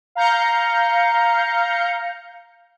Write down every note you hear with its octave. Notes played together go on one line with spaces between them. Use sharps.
F5 A#5 G6 C#7